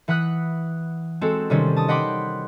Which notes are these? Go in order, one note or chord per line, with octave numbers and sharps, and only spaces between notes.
E3 F#5 B5 D#6 F#6
G#3 C4 F#4 A4
C3 D#3 G3 C4 C#4
A5 D#6
D#5 F#5 G5 B5 C6 D6